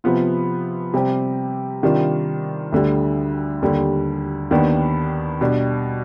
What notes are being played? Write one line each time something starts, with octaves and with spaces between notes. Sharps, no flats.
C3 F3 B3 F4
C3 G3 C4 G4
C3 D#3 G3 D4 F4
D2 D3 G3
D#2 D3 G3
D#2 D#3 B3 D4
B2 G3 D4